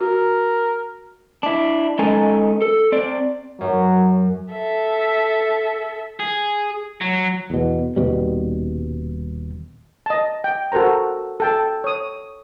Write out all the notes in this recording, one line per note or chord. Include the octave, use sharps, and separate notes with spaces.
F#4 A#4
D4 E4
G#3 C#4 D#4 A4 G#5
A4
C4 D5
F#2 F#3
A4 E5
G#4
F#3
E2 B2
D#1 B2 G3
D#5 A5
G5
F#4 A4 A#4 C5 A#5
A4 G5 A5
C#5 D#6